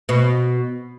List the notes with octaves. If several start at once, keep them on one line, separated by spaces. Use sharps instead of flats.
B2